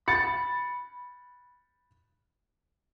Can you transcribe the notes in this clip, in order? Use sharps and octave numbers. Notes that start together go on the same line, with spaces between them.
B5 A6 C#7